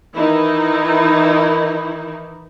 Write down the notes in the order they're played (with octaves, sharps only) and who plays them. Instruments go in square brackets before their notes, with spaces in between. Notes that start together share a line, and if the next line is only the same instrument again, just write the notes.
[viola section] D#3 E3 D#4 E4